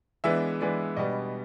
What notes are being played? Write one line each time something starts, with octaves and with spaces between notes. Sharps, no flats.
E3 G#3 B3 D4 E5
E3 G#3 B3 D4
B2 G3 B3 D4 D#5